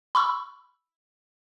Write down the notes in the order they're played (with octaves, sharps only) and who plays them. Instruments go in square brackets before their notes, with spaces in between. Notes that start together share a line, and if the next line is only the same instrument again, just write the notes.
[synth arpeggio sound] B5 C#6 E6